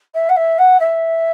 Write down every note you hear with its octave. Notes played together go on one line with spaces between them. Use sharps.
E5
F#5
E5
F#5
E5